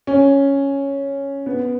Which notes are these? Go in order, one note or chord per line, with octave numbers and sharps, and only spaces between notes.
C#4
B3